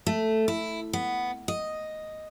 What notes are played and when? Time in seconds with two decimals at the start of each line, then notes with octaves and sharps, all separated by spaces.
0.06 A3
0.48 E4
0.93 B3
1.48 D#5